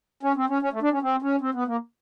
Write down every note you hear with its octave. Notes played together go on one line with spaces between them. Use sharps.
C#4
C4
C#4
C#4
A3
D4
C#4
C4
C#4
C4
B3
A#3